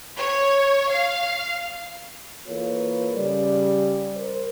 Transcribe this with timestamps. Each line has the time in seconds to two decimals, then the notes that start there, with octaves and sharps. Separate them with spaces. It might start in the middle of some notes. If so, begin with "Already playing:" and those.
0.19 C#5
0.90 F5
2.47 E3 A#3 F4 A4 B4 C#5
3.15 C#3 G3 D5
4.15 A#4 C5